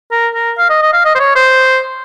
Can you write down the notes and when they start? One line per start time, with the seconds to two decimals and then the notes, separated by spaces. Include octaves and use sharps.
0.11 A#4
0.35 A#4
0.58 F5
0.70 D#5
0.82 D#5
0.93 F5
1.05 D#5
1.15 C5
1.20 C#5
1.35 C5